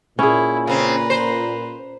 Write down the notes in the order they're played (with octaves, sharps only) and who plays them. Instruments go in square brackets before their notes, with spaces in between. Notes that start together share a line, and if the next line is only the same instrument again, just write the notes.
[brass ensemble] A#2 [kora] C#4 G#4 [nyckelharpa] E4
[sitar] C#3 C4 [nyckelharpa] B4 A#5
[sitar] C5